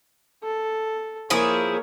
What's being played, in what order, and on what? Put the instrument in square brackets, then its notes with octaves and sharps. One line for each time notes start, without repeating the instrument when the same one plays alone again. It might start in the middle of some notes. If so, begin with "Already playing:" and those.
[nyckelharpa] A4
[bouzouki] F3 E4 G#4 [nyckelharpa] A#3 C#5